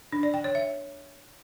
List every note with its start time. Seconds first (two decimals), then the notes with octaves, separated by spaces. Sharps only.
0.12 D4
0.23 D5
0.34 G5
0.44 C#5
0.55 E5